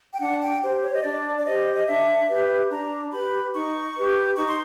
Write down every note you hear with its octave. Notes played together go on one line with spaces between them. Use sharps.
G5
D4 F#5
G5
G4 C5
C#5
D#5
D4 D5
D5
G4 C5 D#5
D#5
D4 E5
G4 B4
D4 A#5
G4 B4 B5
D#4 C#6
G4 B4
D#4 C#6
C6